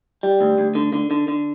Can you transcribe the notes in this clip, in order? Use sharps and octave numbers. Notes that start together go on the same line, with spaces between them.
G3
D2
D2
D3
D3
D3
D3